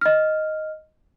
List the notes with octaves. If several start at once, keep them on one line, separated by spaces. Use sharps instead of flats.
D#5 F6